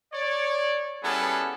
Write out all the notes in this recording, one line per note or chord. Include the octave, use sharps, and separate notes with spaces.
C#5 D5
G3 B3 C#4 E4 G#4 A4